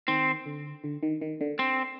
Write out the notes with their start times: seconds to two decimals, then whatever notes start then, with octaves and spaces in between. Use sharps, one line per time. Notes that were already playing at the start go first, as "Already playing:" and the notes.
0.08 D#3 C4
0.46 D3
0.84 D3
1.03 D#3
1.21 D#3
1.41 D3
1.59 C4